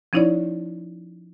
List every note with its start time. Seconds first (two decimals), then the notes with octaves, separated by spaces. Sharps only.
0.13 F3 C#4 D#4 E4 C#5 D5